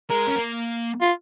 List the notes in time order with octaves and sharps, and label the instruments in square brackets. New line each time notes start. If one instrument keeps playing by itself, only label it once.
[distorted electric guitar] G#3 [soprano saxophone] A#4
[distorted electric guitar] C#4
A#3
[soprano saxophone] F4